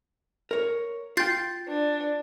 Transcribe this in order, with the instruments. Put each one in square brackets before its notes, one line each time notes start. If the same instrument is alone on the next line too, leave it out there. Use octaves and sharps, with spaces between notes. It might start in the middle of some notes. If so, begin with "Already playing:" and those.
[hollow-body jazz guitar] A#4 C#5
[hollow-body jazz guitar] F4 G5 [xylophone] G6 A6 C7
[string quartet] D4